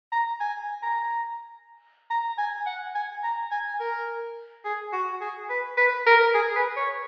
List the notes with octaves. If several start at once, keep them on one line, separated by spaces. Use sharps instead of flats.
A#5
G#5
A#5
A#5
G#5
F#5
G#5
A#5
G#5
A#4
G#4
F#4
G#4
B4
B4
A#4
G#4
B4
C#5